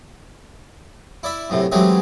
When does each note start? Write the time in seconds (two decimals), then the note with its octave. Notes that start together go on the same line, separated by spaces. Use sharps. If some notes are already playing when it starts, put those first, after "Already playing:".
1.23 E4 D5 E5
1.50 F#2 A2 C3
1.72 E3 F#3 G#3 A3 C4 G4